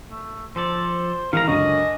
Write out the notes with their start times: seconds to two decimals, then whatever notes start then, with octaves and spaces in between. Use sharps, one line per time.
0.10 A3
0.56 F3 A4 C5 D5
1.33 D#3 E3 G#3 A#4 F5 A#5
1.47 C#2 F#2 D3 D4 A#4 C#5 D#5 G#5